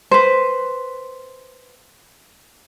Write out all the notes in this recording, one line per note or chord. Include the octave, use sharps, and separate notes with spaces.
B4 C5